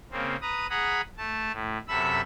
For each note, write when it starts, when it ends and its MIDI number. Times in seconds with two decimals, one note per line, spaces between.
0.11 0.36 49
0.11 0.36 58
0.11 0.36 60
0.42 0.67 71
0.42 0.67 82
0.42 0.67 87
0.70 1.01 68
0.70 1.01 78
0.70 1.01 82
0.70 1.01 83
0.70 1.01 87
1.18 1.52 57
1.18 1.52 81
1.53 1.78 45
1.88 2.21 42
1.88 2.21 48
1.88 2.21 69
1.88 2.21 76
1.88 2.21 83
1.88 2.21 88